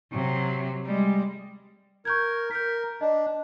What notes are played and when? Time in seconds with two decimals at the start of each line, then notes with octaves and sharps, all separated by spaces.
0.12 C3 F#3
0.85 G3 G#3
2.05 A#4 C#6 G6 G#6
2.51 A#4 G6 B6
3.01 D4 D#5